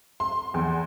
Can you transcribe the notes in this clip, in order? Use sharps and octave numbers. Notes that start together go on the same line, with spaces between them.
C6
E2